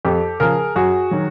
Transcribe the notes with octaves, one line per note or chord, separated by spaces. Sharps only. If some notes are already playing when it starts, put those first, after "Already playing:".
F2 G4 A4
C#3 F3 G#4 A#4
F#2 F#4 G#4
D#3 F#3